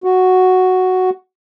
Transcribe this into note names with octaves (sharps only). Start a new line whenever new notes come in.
F#4